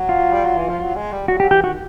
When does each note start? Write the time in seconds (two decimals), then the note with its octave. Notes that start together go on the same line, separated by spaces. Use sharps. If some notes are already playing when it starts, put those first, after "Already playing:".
Already playing: F#3
0.09 F4
0.33 G3
0.44 F#3
0.57 E3
0.69 F3
0.80 F#3
0.96 G#3
1.12 G3
1.28 F#3 F#4
1.40 F#3 G4
1.51 E3 G4
1.64 D#3 F#4